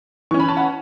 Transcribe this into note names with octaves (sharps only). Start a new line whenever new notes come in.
E3 C#4 C#6
B5
A5
F#5 B5